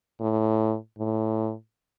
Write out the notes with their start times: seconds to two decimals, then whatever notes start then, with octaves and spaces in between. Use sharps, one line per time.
0.20 A2
0.98 A2